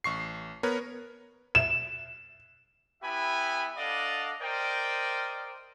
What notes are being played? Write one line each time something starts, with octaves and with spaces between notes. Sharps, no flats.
A1 C#6 C7
B3 A#4 B4 C#5
E7
B3 E4 G4 E5 G#5 B5
D4 A4 D5 D#5 F5 F#5
A#4 C5 D5 D#5 G5